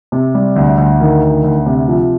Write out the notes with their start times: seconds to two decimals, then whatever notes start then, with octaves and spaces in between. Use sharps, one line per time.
0.12 C3
0.35 G3
0.56 D2
0.78 D2
1.00 D#3
1.23 D2
1.44 D2
1.66 C3
1.88 F3